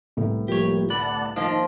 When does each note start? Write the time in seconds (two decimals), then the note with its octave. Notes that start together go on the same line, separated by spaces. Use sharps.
0.17 C2 A2 B3
0.48 F3 G3 A#3 G4 C#5
0.90 D2 D5 F#5 A5 B5
1.36 D#2 F3 A#3 D4 D#4